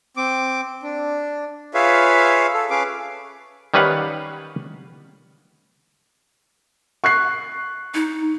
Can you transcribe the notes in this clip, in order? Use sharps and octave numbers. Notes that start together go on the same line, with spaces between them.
C4 D6
D4
F4 G#4 B4 C#5 E5 F5
A4
C#4 G#4 B4 F5 D6
D#3 G3 C#4 B4 F5 F#5
C#6 F#6 C7
D#4